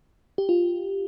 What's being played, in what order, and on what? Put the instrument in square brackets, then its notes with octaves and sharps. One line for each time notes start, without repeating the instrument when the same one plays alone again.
[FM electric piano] G4
F4